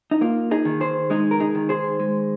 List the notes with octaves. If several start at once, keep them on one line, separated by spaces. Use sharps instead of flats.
D#4
A#3 F4
D#4 G#4
D#3
G#4 C5
G#3 D#4 G#4
A#4
D#4 G#4
D#3
G#4 C5
G#3